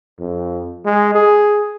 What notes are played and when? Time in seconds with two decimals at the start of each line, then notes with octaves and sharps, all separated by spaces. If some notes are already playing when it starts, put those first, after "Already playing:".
0.19 F2
0.85 G#3
1.15 G#4